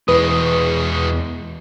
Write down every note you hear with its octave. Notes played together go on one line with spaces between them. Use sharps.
E2 B2 G#3 B4 D#6